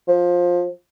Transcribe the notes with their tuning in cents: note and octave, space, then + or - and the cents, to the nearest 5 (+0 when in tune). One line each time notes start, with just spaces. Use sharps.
F3 +15